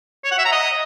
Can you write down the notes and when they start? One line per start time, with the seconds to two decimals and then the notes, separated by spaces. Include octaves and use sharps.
0.24 C#5
0.31 F#5
0.38 E5
0.45 A#5
0.52 D#5